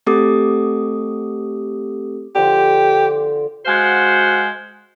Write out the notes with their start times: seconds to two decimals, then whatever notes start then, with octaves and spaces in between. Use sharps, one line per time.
0.06 A3 C4 G4 A4 D6 D#6
2.35 D3 F3 G4
3.66 G#3 F#4 C5 F5 F#5